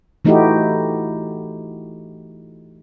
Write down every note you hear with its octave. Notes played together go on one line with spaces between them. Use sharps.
E3 A3 D#4 E4 F#4 G4